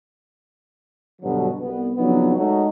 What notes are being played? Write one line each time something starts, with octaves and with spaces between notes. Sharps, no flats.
G2 B2 D3 F#3
C2 B3
F2 C#3 F#3 B3 D4 D#4
G#3 A3 D#4 F#4 C#5 D#5